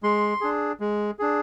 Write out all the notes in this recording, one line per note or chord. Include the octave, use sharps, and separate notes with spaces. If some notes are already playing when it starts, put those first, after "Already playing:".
G#3 C6
D4 G#4
G#3
D4 G#4